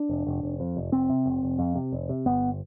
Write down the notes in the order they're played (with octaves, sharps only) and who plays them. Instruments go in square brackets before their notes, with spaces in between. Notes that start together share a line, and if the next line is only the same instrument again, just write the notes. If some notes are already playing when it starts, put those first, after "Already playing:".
Already playing: [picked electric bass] D4
F1
F1
F1
F2
F1
F1 C4
C3
F1
F1
F2
C3
F1
C3
G1 B3